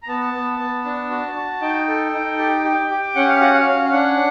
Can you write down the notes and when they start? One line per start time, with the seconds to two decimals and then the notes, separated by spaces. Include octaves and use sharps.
0.03 A#5
0.08 B3 A5
0.34 B3
0.59 B3
0.85 D4
1.10 F#4
1.36 F#4
1.61 D#4 G5
1.88 A4
2.13 D#4
2.39 G4
2.65 G4
2.91 G4
3.15 C#4 F#5
3.28 F5
3.41 F#4 F#5
3.54 F5
3.66 C#4
3.85 F5
3.92 D4 F#5